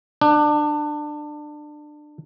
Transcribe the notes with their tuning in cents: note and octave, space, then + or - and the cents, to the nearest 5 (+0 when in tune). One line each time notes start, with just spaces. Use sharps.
D4 +25